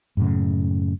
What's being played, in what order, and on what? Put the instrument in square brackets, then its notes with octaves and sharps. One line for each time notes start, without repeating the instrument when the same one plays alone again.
[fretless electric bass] F#2 A2 C#3